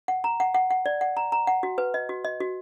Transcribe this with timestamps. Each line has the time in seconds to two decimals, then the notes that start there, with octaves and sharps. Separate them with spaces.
0.08 F#5
0.24 A#5
0.40 F#5
0.54 F#5
0.71 F#5
0.86 D5
1.01 F#5
1.17 A#5
1.32 A#5
1.47 F#5
1.63 F#4
1.78 B4
1.94 D#5
2.09 F#4
2.25 D#5
2.40 F#4